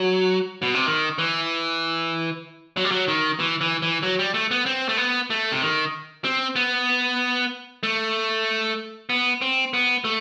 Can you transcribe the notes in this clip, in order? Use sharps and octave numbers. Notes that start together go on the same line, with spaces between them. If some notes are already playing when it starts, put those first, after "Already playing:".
Already playing: F#3
B2
C3
D#3
E3
F#3
G3
F#3
D#3
E3
E3
E3
F#3
G3
A3
B3
C4
A3
B3
A3
C3
D#3
C4
B3
A3
B3
C4
B3
A3